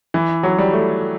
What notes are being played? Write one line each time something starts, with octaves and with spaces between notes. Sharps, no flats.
E3
F#3
G3
A3